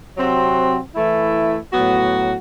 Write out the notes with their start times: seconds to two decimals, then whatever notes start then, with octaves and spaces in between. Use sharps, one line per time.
0.17 C3 F#3 C4 F#4
0.95 E3 A3 E4
1.72 A2 F#3 B3 F#4